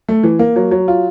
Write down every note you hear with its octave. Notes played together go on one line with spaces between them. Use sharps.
A3
E3
A#3
F#3
F#3
F4